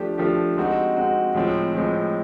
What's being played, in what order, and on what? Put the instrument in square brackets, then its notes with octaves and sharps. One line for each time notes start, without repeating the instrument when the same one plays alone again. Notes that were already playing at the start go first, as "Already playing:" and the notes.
Already playing: [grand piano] F3 A3 D4 G4
F3 A3 D4 G4
G#3 C4 D#4 F#4
G#3 C4 D#4 F#4
A2 F3 G#3 C4
A2 F3 G#3 C4